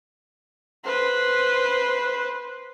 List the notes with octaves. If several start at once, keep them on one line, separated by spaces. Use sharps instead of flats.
B4 C5